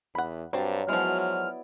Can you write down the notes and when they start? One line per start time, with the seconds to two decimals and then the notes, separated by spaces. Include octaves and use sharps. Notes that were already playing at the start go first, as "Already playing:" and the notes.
0.15 E2 F#5 B5
0.53 G2 F#3 C4 D5
0.89 F3 F#3 G#3 B3 E4 D5 F6
1.20 F6